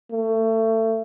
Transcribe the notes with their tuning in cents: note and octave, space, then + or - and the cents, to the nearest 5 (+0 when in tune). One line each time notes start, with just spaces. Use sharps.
A3 +25